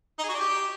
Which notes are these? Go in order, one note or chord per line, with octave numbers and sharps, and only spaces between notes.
D#4
G#4
F#4
D5
G4